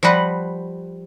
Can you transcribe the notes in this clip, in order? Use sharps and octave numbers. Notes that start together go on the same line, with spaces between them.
F3 G3 F#4 B4 F#5